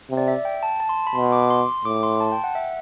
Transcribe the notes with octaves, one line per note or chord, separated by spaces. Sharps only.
C3
D5
E5
G5
A5
A5
C6
B5
B2 C6
D6
C6
A2 D6
C6
A5
G5
F#5
E5